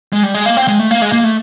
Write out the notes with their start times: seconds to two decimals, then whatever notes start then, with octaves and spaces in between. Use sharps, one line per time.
0.13 G#3
0.23 G3
0.35 G#3
0.46 A#3
0.57 C4
0.68 G#3
0.80 A3
0.91 A#3
1.02 G#3
1.12 A#3
1.24 A3